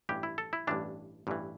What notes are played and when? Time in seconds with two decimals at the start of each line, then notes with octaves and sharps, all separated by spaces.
0.09 A1 G2 E3 G4
0.23 E4
0.38 A4
0.53 E4
0.67 A1 G2 E3 D4
1.27 A1 G2 E3